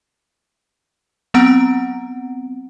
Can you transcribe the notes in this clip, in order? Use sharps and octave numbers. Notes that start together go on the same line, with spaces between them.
F#3 B3 C4 F#5 A#5 D7